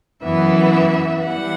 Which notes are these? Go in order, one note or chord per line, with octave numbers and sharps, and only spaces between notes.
F#2 E3 B3 E5
E3 G3 F#5